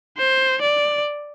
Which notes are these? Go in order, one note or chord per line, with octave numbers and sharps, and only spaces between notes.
C5
D5